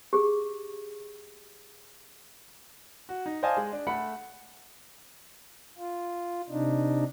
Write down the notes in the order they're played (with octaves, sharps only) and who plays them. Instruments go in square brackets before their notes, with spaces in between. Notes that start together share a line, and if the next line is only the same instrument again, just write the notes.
[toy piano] G4 G#4
[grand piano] F#4
D#4
C5 D5 D#5 F5 G#5 A5
G#3
D4
A3 A4 F#5 B5 C#7
[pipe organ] F4
C3 D4 D#4